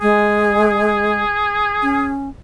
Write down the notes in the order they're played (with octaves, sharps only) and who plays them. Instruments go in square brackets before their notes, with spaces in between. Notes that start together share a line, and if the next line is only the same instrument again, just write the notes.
[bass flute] G#3 [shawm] G#4
[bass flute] C#4